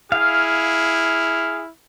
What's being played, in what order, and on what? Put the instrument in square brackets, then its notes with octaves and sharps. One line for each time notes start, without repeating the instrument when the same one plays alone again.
[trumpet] E4 [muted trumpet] G#4 [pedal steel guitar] F5 [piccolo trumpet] F6